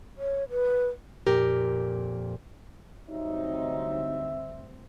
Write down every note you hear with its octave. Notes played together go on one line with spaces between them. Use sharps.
C#5
B4
F2 A#2 G4 A#4
D2 G2 C3 F#3 C4 D#4 E5